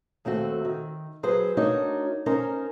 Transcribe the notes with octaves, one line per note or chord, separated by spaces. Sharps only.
D#2 A3 C4 F#4
D#3
F#3 G#4 B4 C5
A3 D4 D#4 F#4 A#4 C#5
C#4 D#4 A#4 C5